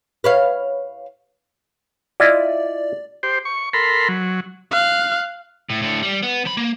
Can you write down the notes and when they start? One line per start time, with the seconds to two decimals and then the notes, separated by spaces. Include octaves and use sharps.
0.24 B4 C#5 F5
2.20 E4 F4 D5 D#5
3.23 G4 C5
3.45 C#6
3.73 A4 A#4 B5 C6
4.09 F#3
4.71 F5 F#6
5.70 A2
5.82 A2 D3
6.03 G3
6.23 B3
6.45 F3 B5
6.57 A#3